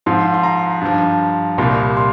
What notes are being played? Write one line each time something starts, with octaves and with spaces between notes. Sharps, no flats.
G#2 F3 C6
C6
A#5
G2 F3
C2 A#2 G3 C6
C6